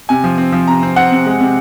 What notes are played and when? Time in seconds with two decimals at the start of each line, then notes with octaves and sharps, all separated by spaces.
0.09 C3 G#5
0.24 F3
0.38 C4
0.52 F3
0.68 C3 A#5
0.83 C4
0.96 C4 F#5
1.12 C3
1.26 G#3
1.40 C3